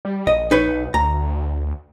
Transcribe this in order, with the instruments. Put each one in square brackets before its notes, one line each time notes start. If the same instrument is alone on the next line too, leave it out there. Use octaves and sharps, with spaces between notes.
[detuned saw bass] G3
[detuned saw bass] A#1 [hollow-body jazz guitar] D#5
[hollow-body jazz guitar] D#4 B4 C#5
[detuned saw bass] B1
[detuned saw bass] D2 [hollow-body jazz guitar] A#5